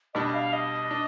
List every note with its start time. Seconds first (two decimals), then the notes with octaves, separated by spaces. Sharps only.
0.14 B2 G3 D4 D#5
0.34 F5
0.53 D#5
0.91 D4